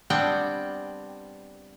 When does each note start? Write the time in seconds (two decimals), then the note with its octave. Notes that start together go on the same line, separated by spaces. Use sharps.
0.10 G3 B3 C4 D4 F#5 G5